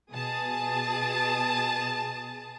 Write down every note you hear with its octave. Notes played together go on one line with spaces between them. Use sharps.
B2 G#4 A5 D#6